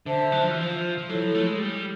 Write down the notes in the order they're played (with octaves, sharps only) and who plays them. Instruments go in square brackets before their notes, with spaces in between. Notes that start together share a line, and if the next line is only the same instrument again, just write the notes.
[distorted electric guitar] D3 [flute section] C5 E5 A5
[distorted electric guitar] F#3
F3
E3
F3
F3
[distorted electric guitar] F#3 [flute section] E4 A4 C#5
[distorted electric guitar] F3
A3
G#3
G3